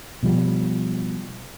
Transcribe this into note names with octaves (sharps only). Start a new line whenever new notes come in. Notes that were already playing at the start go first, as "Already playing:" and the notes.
B2 F3 G3